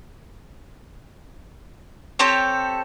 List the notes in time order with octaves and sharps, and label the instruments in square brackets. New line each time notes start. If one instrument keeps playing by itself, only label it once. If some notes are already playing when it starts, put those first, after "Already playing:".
[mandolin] C4 G4 A4 C#5